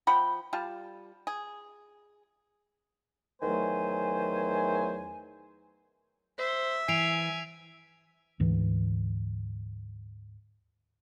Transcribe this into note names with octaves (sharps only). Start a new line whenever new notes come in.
F3 F#5 G5 B5
G3 F4 A5
G#4
E2 D#3 F#3 A3 C5 G#5
C5 E5
E3 G#5 C7 D7 F7
D2 G#2 E3